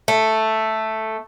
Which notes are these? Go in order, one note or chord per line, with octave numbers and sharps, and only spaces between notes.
A3